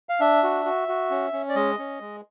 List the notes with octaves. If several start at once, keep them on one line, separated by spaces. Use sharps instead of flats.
F5
D4 E5
F#4
F#4
F#4
C#4
C#4
D5
G#3 D#5
C#4
G#3